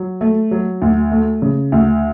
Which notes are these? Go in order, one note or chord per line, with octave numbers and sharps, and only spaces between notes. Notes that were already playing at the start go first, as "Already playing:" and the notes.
Already playing: F#3
A3
F#3
D2
A3
C#3
D2